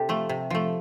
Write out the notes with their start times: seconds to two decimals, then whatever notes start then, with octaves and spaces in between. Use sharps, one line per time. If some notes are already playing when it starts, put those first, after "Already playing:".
Already playing: C3 G4 A4
0.09 F3 A3
0.29 C3
0.50 F3 A3